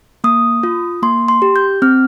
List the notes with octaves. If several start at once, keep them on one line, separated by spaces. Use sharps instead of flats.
A#3 D#6
F4
A#3 C6
C6
G4
G6
C4 F6